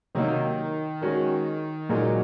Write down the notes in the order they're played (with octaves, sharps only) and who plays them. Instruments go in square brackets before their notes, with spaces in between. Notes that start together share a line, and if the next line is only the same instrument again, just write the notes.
[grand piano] C3 F#3 A#3 D#4 [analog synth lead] D#3
[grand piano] G#3 C#4 F#4 A#4
[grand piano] A#2 G#3 D#4 F#4 A#4 [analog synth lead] F#3